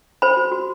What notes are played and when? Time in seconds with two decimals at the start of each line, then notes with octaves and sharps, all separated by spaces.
0.22 C5 B5
0.37 F#4
0.52 F#4